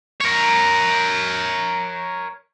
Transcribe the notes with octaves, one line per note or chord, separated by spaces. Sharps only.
A#4 C#5